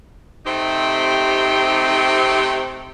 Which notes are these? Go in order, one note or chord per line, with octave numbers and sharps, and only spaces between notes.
C3 A3 C4 D#4 G4